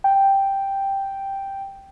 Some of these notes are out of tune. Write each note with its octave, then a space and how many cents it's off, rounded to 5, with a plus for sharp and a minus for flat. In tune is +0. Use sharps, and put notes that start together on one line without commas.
G5 +0